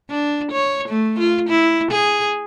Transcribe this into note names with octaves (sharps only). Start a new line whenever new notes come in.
D4
C#5
A3
F4
E4
G#4